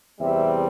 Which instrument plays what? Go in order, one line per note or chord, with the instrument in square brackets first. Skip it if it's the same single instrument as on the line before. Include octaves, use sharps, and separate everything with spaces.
[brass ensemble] E2 C3 G3 C4 E5